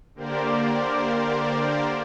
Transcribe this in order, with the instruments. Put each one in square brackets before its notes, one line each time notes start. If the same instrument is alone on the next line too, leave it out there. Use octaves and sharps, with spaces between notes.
[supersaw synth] D3 A#3 G4 A#4 C5 D5